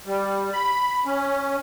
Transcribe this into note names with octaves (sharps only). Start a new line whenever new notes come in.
G3
B5
C#4